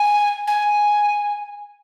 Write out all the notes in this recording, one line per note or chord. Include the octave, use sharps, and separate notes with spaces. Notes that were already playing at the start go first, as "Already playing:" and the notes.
Already playing: G#5
G#5